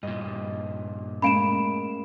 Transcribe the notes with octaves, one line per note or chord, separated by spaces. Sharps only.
G2 A#2 D#5
A2 G#3 A#3 C#4 F5 B5 D7 E7